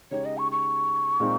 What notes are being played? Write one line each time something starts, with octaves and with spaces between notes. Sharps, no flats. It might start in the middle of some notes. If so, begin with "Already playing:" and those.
C#3 G#3 D#4 G4 C#5
D#5
C#6
C#6
A#2 G#3 C4 D#4